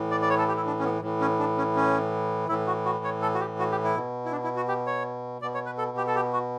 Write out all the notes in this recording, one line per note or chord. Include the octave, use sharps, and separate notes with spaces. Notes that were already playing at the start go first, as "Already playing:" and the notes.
Already playing: A2 E3
D5
D5
C#5
A4
G4
E4
D4
C#4
B3
A2 E3
C#4
D4
C#4
C#4
A2 E3 E4
F#4
F#4
C#5
A4
F#4
G4
F#4
G4
E4
B2
E4
D4
E4
F#4
G4
C#5
B2 D5
C#5
B4
A4
G4
A4
G4
F#4